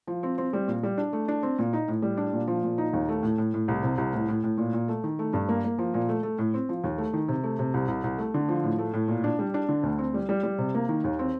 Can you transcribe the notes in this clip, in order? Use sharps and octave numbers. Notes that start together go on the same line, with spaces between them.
F3
C4
C4
G3
A#2
G3
D4
A3
D4
C4
A#2
D#4
A2
G3
D4
A#2
F3
A#2
D#4
D#2
A3
A2
A2
A2
C2
C3
C2
A2
A2
A2
A#2
A#2
A3
D#3
A3
G2
A#3
A#3
F3
A#2
A3
A3
A2
C4
F3
D#2
A3
D#3
C3
A3
C3
C2
C2
C2
A3
D3
F3
A2
A3
A2
A#2
D4
G3
D4
D3
D2
C4
G3
G3
G3
C3
A#3
D#3
D#2
C4